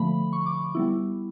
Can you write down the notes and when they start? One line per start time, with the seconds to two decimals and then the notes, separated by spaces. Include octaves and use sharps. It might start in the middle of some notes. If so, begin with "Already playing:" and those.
Already playing: D3 F3 A3 B5
0.33 C#6
0.46 D6
0.75 G3 B3 E4